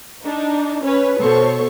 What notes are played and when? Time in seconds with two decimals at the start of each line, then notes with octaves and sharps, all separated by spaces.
0.24 D4 D#4
0.84 C#4 B4 C#5
1.18 B2 A4 C5 C#5 C#6